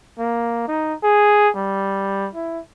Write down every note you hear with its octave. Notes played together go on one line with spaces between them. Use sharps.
A#3
D#4
G#4
G3
E4